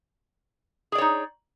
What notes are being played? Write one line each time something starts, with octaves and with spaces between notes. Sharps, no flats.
D#4 G#4 C#5 D5